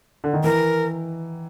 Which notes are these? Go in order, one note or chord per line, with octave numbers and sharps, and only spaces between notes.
D3
D#3
E3 A#4